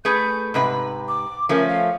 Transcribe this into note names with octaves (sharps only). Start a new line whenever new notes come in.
A3 G#4 B4 G6
G#2 C3 B4 B5
D6
F3 A3 C#4 A#4
F5